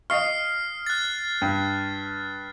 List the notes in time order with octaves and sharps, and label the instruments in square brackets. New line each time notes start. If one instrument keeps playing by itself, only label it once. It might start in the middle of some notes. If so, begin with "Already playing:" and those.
[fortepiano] D#5 F5 C#6 [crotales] F6 C7
[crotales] F#6 A6
[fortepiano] G2